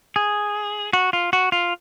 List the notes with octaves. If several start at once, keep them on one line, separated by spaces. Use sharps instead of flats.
G#4
F#4
F4
F#4
F4